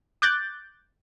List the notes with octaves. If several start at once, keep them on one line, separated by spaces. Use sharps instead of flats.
D6 F#6 G6 A6